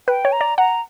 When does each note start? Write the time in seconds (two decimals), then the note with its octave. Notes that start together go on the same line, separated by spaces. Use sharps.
0.08 B4 G5
0.25 C#5
0.32 A#5
0.41 D5
0.58 F#5 A#5